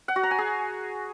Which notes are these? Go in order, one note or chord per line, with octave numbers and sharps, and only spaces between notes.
F#5
F#4
A#5
G#5
G#4